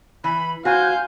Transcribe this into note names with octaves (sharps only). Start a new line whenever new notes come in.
E3 B5
F#4 C5 F5 G#5 G6